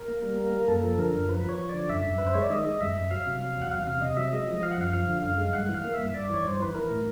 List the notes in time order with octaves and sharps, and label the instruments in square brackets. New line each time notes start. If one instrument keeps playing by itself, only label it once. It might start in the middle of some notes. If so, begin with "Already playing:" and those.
Already playing: [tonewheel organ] A#4
A#3
G3
A#3
A#3
F#2 A4
F3
D3 A#4
F#2
F3 B4
F3 C#5
F3
D3 D5
F#2 E5
F#2
F#2 B4
C5
G#3 C#5
D5
D#3 D#5
G#3
F#2 E5
F#2
F#3 F5
C3
F#3
E2 F#5
E2 F5
C3 F5
C3 D#5
F#3 E5
G#3 D#5
F3
F3 F5
F#5
F#2 F5
F3 F5
D3
F#2 F5
G#3
G2 F#5
E3
F5
A#3
E5
G2
G2 D5
E3 C#5
G2 C5
E3 B4
E3 A#4
A2